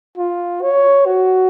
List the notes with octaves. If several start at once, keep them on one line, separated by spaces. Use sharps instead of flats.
F4
C#5
F#4